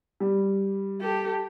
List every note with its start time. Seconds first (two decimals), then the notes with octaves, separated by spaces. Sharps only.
0.20 G3
1.01 G4 A4